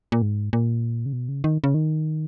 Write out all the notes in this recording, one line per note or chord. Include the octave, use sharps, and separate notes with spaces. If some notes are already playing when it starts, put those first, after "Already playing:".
A#2
G#2
A#2
C#3
B2
C#3
D#3
C#3
D#3